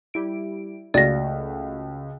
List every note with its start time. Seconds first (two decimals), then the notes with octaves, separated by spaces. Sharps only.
0.14 G3 E4 D7
0.94 C#2 A3 F#4 D5 F5 A#6